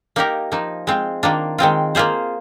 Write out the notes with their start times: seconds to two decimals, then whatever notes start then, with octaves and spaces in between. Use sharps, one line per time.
0.16 A#3 D#4 G4 A#4
0.52 F3 A#3 D#4
0.87 G#3 C4 F4
1.23 D#3 A#3 D4 F4
1.58 D#3 G#3 C4 F4
1.95 A#3 F4 G#4 C5